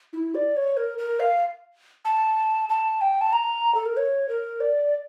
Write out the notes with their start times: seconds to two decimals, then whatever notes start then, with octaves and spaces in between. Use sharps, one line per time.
0.13 E4
0.35 D5
0.56 C#5
0.77 A#4
0.98 A#4
1.20 F5
2.05 A5
2.69 A5
3.01 G5
3.21 A5
3.33 A#5
3.75 A4
3.86 A#4
3.97 C#5
4.29 A#4
4.60 D5